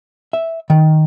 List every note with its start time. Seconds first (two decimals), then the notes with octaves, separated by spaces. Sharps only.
0.33 E5
0.70 D#3